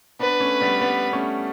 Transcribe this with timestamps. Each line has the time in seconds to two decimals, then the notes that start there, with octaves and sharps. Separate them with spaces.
0.19 B3 D4 B4
0.40 A3 C#4
0.61 G3 B3
0.81 G3 B3
1.13 A3 C#4